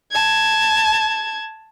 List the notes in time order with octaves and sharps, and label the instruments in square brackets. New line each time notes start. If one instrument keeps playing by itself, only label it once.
[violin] A5 G#6